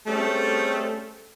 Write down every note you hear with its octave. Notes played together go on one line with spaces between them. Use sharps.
G3 A3 C4 C#4 G#4 A4